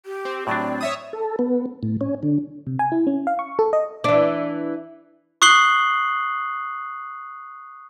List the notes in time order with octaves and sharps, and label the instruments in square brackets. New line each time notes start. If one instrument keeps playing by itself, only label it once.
[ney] G4
[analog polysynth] C4
[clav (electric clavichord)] A2 F#3 D4 [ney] D5
[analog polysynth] C#5 E5 D#6
[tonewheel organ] A4
B3
A2
C#4
D3
[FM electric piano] C3
G#5
E4
C#4
F5
C#6
A4
D#5
[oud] E3 D4
[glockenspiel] C#6 D#6 F#6 C7 F#7 G7